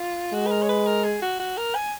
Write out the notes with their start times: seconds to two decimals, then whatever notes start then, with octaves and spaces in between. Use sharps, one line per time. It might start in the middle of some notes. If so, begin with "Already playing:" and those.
Already playing: F4
0.33 G#3 F#4
0.47 B4
0.51 A#4
0.63 C#5
0.69 B4
0.86 A#4
1.04 G#4
1.22 F#4
1.40 F#4
1.57 A#4
1.75 G#5